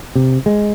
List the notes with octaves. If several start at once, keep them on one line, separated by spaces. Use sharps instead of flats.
C3
G#3